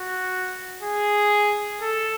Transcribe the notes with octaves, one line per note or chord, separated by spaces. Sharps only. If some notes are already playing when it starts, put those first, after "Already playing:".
Already playing: F#4
G#4
A4